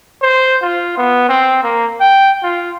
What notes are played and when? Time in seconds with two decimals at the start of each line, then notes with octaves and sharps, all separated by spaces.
0.22 C5
0.62 F4
0.97 B3
1.28 C4
1.63 A#3
2.00 G5
2.43 F4